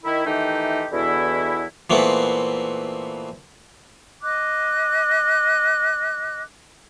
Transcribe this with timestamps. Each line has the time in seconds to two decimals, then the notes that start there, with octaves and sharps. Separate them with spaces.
0.04 D#3 E4
0.26 D#3 E3 A3 D#4 G4
0.92 E2 B2 D3 E3 E4
1.90 A#2 E3 A3 B3 C4
4.23 D#5 D6 F#6